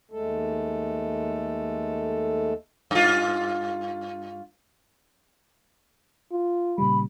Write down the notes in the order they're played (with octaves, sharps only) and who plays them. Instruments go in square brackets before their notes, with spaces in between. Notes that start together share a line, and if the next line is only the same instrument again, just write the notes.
[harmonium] D#2 G#3 A3 A4
[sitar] G2 F4
[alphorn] F4
[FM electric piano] A#2 C#3 G3 [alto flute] B5